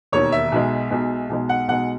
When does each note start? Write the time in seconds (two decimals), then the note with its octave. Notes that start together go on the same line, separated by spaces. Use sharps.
0.12 E1 D#2 D#3 C#5
0.32 E5
0.52 B1 B2 G#3
0.91 B1 B2 G#3
1.30 B1 B2 G#3
1.49 F#5
1.68 B1 B2 G#3 F#5